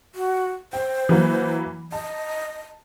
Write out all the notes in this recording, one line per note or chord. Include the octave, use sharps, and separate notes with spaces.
F#4
C5 G5
E3 F#3 A#3
D#5 A5